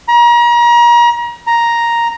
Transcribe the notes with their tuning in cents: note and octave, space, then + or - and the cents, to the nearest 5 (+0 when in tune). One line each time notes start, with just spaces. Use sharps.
A#5 +35
A#5 +5